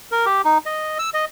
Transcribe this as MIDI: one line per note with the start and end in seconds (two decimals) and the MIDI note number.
0.12 0.26 70
0.26 0.42 67
0.45 0.58 63
0.66 0.98 75
0.99 1.10 88
1.14 1.25 75